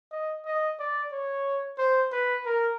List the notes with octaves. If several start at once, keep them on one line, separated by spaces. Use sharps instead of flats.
D#5
D#5
D5
C#5
C5
B4
A#4